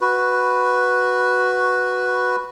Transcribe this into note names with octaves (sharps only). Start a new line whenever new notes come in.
F#4 B4